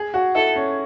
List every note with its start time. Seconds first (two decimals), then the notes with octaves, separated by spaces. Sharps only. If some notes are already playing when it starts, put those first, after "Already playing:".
Already playing: G#4
0.14 F#4
0.35 E4 A4
0.56 C#4